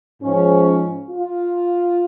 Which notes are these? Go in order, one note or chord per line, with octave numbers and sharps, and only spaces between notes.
G#2 F3 C#4
F4